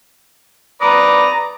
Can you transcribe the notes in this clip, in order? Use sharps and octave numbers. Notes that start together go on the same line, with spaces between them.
B4 D5 A#5 D#6